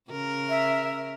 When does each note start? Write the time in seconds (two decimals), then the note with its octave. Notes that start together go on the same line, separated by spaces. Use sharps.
0.11 C#3 A#4
0.49 E5